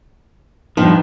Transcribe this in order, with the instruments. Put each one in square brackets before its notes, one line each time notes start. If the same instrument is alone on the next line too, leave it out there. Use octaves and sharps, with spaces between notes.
[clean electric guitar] G2 F3 [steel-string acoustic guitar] D#3